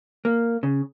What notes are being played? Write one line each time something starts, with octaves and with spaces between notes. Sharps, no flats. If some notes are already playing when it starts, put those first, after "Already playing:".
A#3
C#3